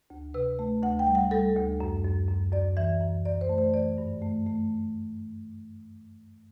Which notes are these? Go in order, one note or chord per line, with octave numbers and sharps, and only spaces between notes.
D2
C3 B4
A3
D2 F#5
G5
G3
F#5
G3 A4
D2
F#2
F#2
F#2
F#2 D5
E3 E5
F#2
F#2 D5
C5
A3
C5
E3 D5
G2
A3
A3